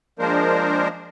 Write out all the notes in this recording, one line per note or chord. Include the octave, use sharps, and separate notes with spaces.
F3 G#3 A#3 D4 A#4 C5